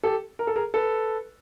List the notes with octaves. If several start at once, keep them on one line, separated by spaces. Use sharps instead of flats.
G4 A4
A#4
A4
G#4 A#4
A4 B4